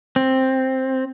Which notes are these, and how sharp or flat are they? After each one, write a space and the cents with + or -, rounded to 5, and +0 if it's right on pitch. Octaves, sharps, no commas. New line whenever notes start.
C4 +5